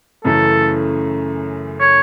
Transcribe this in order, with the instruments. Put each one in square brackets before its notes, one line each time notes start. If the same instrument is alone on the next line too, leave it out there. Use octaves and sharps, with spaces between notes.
[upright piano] F#2 C#3 E3 A3 [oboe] A4
[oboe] C#5